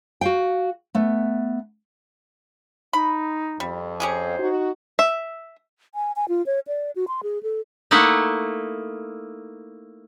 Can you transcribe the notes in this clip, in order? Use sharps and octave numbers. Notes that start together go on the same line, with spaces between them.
F#4 F5 G5
A3 B3
D#4 B5
F2 G3
C#4 G4 G#4 C5
D#4 F#4
E5
G#5
G#5
F4
C#5
D5
F#4
C6
G#4
A4
A3 A#3 D#4 E4 F#5